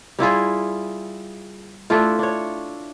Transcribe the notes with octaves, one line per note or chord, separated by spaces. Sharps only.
G3 E4 F4 G#4
A3 D4 E4 F4
D4 C#5